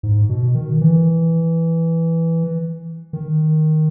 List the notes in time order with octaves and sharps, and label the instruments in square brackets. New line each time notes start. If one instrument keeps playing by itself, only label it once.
[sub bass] G#2
B2
D#3
E3
D#3